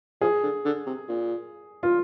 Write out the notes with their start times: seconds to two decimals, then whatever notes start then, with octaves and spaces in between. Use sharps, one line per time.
0.21 F3 G#4
0.43 D3
0.65 D3
0.86 C3
1.08 A#2
1.83 F4